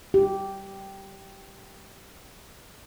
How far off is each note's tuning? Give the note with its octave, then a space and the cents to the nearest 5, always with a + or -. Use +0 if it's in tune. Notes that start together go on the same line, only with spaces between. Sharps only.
G4 -10